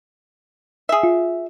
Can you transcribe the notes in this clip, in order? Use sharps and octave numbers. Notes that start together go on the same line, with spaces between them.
G#4 E5
F4